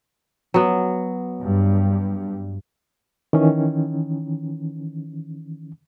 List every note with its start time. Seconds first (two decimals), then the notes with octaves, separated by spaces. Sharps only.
0.54 F#3 B3
1.40 G2
3.33 D#3 E3 C#4